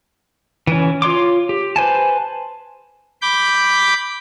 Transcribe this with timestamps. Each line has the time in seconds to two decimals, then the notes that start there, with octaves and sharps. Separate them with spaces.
0.67 E3 C#4
1.02 F4 C#5 C6 D6
1.49 G4
1.76 B4 C5 G#5 A5
3.22 B5 D6 G6